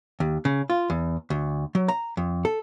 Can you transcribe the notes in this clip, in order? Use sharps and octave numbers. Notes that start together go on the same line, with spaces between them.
D#2
C#3
F4
E2
D2
F#3
A#5
F2
A4